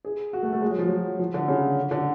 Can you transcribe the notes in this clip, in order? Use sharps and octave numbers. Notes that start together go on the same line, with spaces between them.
G#4
F#4
A3
A3
G#3
F#3
F3
F#3
F3
D3
C#3
D3